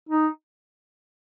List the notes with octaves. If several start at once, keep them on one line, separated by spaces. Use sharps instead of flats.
D#4